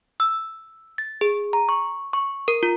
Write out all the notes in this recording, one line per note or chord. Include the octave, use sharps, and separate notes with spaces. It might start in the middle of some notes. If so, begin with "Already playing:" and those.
E6
A6
G#4
A#5
C#6
C#6
A#4
F4